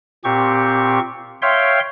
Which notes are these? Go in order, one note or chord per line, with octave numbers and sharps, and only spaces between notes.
A#2 C4 G4 C#6
C#5 E5 F5 G5 C6